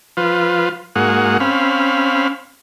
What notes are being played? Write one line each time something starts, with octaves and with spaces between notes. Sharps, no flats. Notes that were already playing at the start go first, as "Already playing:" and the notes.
F3 F4 B4
G#2 A#3 F#4 G#4 F#5
C4 C#4 F5 B5